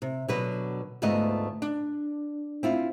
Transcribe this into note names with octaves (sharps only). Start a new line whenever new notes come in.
C3
B2 D3 F#3 B4
D2 G#2 A3 B3 F4 D#5
D4
C4 E4 F4